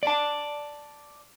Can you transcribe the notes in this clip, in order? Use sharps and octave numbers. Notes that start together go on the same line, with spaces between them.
D5 A5